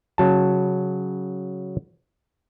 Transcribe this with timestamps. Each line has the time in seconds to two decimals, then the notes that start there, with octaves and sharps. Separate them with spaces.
0.18 C#3 F#3 A5